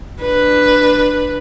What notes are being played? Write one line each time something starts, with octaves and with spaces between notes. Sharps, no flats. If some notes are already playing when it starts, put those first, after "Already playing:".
D4 B4